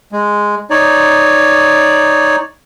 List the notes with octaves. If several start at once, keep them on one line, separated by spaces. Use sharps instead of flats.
G#3
D#4 C#5 D5